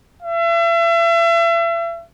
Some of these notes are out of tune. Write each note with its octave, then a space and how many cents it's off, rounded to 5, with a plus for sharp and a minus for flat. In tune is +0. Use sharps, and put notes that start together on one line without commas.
E5 +40